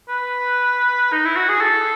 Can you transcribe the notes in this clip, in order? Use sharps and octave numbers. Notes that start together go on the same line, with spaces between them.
B4
D#4
E4
F#4
G#4
A4